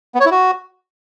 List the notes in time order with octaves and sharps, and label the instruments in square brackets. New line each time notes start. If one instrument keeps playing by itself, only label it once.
[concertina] B3
C#5
E4
F#4